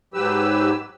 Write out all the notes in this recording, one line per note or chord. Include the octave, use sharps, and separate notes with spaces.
G#2 F#3 G4 B4 E6